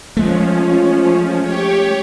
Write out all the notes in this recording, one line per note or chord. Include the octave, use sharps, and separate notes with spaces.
F3 G#3 A3 C#4
G4 C#5